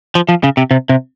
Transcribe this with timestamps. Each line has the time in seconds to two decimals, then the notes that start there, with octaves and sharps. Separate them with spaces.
0.15 F3
0.29 F3
0.43 C#3
0.57 C3
0.71 C3
0.89 C3